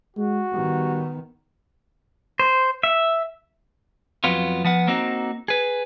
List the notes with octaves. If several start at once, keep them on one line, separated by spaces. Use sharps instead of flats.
G#3 F#4
D#3 G3 B3
C5
E5
F2 F#3 B3 F4
F3 B3 F#5
A#3 C4 D#4 F#4
G#4 B4